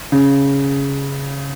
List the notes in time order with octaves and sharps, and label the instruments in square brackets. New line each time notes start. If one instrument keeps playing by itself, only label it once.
[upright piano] C#3